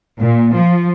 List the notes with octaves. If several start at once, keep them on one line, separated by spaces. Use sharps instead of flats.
A#2
F3